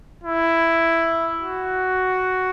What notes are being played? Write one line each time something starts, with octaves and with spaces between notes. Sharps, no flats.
E4
F#4